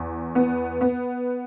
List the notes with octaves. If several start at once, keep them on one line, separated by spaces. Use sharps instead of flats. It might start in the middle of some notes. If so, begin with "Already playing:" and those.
Already playing: E2
B3
B3